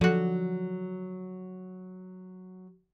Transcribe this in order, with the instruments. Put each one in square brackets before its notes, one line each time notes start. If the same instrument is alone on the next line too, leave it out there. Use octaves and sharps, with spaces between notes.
[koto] D3 F#4 [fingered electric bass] F3 [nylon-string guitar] F#3